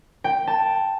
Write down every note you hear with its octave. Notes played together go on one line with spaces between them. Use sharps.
G5
A5